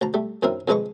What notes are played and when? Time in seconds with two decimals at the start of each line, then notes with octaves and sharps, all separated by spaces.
0.01 D2 A5 A#5
0.14 G3 A3
0.42 F#2 D#3 C4 E4 A#4
0.68 F2 D3 G#3 B4 D#5 C#6